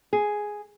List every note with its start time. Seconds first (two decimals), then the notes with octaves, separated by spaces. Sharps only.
0.13 G#4